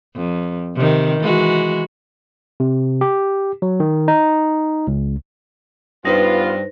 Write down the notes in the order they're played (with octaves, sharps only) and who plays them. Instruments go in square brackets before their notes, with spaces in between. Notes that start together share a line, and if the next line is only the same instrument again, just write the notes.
[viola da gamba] F2
C3 D#3
E3 G#3 F#4
[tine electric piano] C3
G4
F#3
D#3
D#4
C#2
[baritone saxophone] G2 [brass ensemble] B3 F4 [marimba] D#4 B4 [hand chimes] C5 A#6